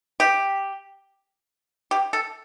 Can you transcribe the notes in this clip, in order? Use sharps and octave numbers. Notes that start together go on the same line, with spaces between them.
G4
G4
A4